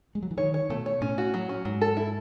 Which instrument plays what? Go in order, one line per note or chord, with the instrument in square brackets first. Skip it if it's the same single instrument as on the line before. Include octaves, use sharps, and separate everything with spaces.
[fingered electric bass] G#3
F#3
E3
[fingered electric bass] D#3 [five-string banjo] C#5
[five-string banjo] C#5
[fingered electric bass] B2 [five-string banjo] A3
[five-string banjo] C#5
[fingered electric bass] A2 [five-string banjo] C#4
[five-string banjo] F#4
F#3
C#4
[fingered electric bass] G#2 [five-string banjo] F#3
[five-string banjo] A4
E4